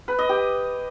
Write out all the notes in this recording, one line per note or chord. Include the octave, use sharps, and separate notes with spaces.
B4
D#5
G4